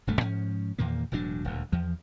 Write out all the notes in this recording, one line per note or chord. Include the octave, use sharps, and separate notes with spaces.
D#1 D2 G2 A3
G#2 F3 C#4
E2 A#2 D#3 A#3
E1 A2 F#3 D4
D#1 D2
E2 F3